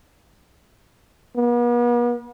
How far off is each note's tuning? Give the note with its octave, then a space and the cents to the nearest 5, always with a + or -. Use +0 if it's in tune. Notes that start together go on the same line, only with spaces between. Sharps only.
B3 -45